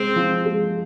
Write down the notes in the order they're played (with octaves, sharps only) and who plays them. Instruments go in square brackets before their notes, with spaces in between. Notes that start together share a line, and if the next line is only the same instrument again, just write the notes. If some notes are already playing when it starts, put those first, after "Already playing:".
Already playing: [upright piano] G#3 [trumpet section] C4
[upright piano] F3
G#3